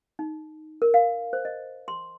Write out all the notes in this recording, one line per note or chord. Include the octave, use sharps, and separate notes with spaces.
D#4
A#4
F5
C5
D#5
C6